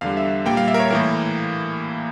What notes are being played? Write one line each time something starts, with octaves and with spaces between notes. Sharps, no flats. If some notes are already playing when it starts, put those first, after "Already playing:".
E2 D3 G3 F5
E5
A#2 G3 A#3 G5
F5
E5
A#4
C#5
A2 E3 A#3 A#4